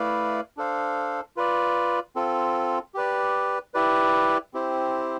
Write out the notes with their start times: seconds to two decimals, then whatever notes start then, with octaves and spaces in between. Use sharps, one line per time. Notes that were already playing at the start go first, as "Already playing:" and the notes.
Already playing: A3 E4 B4 D5 F5
0.57 D4 A4 C5 F5
1.36 F4 B4 D5
2.16 C4 F4 A4
2.94 G4 B4 D5
3.74 E4 G4 B4 D5
4.54 C4 E4 G4 C5